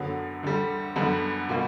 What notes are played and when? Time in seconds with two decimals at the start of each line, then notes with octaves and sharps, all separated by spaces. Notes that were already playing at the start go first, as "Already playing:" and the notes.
Already playing: F#2 D3 F#3 B3
0.43 D2 D3 G3
0.96 F#2 D3 G3 B3 F#5
1.49 B2 G3 A#3